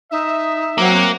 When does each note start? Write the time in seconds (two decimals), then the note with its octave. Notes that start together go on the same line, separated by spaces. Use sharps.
0.11 D#4 E5
0.78 F#3 A#3 C4 F#5